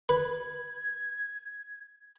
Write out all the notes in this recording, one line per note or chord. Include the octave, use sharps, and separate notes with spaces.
B4 G#6